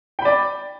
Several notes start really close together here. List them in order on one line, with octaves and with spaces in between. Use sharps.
G5 B5 D5